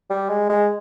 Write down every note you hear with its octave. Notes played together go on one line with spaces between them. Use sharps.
G3
G#3
G#3